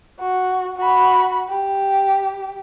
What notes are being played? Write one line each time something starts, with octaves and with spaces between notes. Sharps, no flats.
F#4
F#4 B5
G4